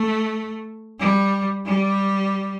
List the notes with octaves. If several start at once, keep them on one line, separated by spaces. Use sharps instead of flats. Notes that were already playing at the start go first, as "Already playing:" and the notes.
Already playing: A3
G3
G3